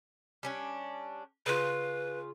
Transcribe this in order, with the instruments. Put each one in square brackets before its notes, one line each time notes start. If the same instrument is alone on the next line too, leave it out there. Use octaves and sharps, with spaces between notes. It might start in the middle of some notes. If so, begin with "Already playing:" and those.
[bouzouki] G3 C#4 D4
[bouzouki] C#3 F4 [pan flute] B4